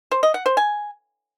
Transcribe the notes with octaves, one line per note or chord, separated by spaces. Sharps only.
C5
D#5
F#5
C5
G#5